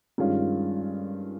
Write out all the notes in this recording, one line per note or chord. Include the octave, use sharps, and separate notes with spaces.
G2 D#3 G#3 C#4 F4